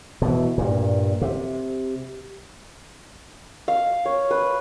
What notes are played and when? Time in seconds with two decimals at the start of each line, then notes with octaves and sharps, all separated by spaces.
0.22 B2 E3
0.58 G2 A#2
1.21 C3
3.68 F5
4.05 C#5
4.31 B4